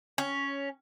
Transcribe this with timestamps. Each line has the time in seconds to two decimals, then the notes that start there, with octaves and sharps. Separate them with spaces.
0.18 C#4